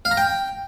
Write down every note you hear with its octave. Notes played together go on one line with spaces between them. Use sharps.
F5
A#5
G5